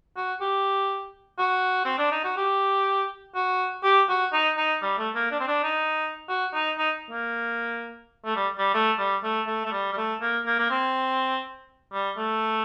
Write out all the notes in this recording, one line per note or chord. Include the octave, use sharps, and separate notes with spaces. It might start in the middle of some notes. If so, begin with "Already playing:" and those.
F#4
G4
F#4
C4
D4
D#4
F#4
G4
F#4
G4
F#4
D#4
D#4
G3
A3
A#3
D4
C4
D4
D#4
F#4
D#4
D#4
A#3
A3
G3
G3
A3
G3
A3
A3
A3
G3
G3
A3
A#3
A#3
A#3
C4
G3
A3